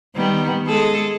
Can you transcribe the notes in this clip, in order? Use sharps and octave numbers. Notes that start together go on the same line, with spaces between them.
D#3 G3 B3
G#3 G#4 A4